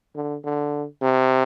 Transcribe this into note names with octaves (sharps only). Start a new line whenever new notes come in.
D3
D3
C3